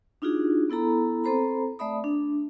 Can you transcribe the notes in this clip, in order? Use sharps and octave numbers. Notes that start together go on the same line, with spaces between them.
D4 D#4 F4 F#4 G#4
B3 E4 A4 A#5 B5
C4 A4 C5 A#5 B5
A3 D5 E5 B5 D#6
D4